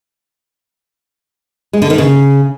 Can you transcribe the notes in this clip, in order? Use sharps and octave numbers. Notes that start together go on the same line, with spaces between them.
G#3
D3
D#3
C#3